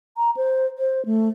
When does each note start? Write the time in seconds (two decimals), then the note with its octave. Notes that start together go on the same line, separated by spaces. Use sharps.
0.17 A#5
0.37 C5
0.78 C5
1.06 A3